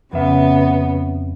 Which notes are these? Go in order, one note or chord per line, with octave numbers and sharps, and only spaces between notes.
F2 C#3 B3 E5